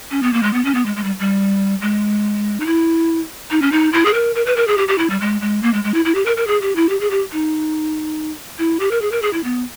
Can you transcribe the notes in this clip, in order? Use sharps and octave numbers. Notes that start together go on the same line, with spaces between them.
C#4
B3
A#3
G#3
B3
C#4
B3
G#3
G#3
G3
G3
G#3
D#4
E4
D#4
C#4
D#4
E4
G#4
A#4
A#4
B4
A#4
G#4
G4
G4
E4
G3
G#3
G#3
A#3
G#3
G#3
E4
E4
G4
A#4
A#4
G#4
G4
E4
G4
G#4
G4
D#4
E4
G4
A#4
G#4
A#4
G#4
E4
B3